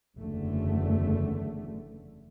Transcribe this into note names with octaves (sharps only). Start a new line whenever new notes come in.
F#1 E2 D3 A3